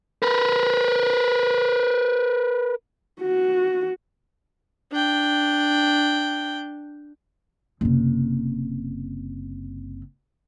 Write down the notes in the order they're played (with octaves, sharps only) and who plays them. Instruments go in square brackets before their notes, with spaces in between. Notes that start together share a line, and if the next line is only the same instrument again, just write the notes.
[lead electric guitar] A#4 B4
[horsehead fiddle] F#4
[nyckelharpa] D4 G5
[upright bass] F#1 C3